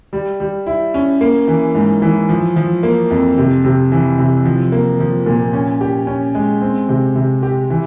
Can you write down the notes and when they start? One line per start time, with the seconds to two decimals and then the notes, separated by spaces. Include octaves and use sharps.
0.13 G3
0.40 G3
0.67 E4
0.94 C#4
1.21 A#3
1.48 E3
1.75 G#2
2.02 E3
2.29 F3
2.56 F3
2.83 A#3
3.11 F2
3.38 C3
3.64 C3
3.92 E3
4.19 C3
4.45 F3
4.72 A#3
5.00 F3
5.26 A#2
5.53 C#4
5.81 G4
6.07 C#4
6.35 G#3
6.62 C4
6.89 C3
7.16 C3
7.43 G4
7.70 E3